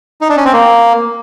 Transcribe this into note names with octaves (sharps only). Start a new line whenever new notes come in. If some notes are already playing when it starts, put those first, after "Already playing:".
D#4
D4
C#4
C4
A#3